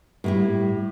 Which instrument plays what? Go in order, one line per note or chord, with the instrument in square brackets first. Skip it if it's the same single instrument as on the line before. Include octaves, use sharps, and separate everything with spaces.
[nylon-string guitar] A2 G3 E4